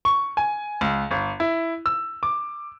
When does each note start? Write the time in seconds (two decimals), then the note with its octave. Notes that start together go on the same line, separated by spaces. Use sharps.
0.05 C#6
0.37 G#5
0.81 C#2
1.11 G1
1.40 E4
1.86 E6
2.23 D6